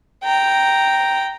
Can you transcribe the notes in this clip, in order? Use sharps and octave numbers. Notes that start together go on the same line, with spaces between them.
G5 A#5